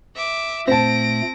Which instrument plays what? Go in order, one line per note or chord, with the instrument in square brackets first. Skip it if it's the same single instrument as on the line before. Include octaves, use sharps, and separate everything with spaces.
[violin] E5 D6
[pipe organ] A#2 A3 [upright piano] C4 A5 [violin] A#6 D7